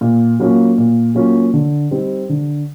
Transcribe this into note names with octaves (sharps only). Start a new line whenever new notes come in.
A#2
F#3 A#3 C#4 F4
A#2
F#3 A#3 C#4 F4
D3
G3 C4 D#4
D3